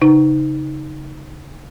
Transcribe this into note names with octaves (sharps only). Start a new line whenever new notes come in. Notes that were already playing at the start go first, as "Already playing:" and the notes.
C#3 D#4